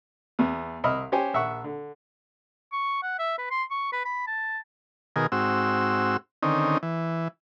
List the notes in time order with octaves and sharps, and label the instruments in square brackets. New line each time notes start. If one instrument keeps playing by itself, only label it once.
[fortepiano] E2 B3
C2 D#5 E5 B5 F6
C#4 G4 C5 G#5
A#1 E5 F#5 C#6
D3
[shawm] C#6
F#5
E5
B4
C6
C#6
B4
B5
A5
[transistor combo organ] B2 D#3 G#4 A#4
G#2 C4 F#4 E6
D3 D#3 C4 C#4 D#4
E3